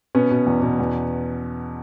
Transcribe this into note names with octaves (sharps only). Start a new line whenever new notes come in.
B2 B3 C#4
B2
E2
B2
E2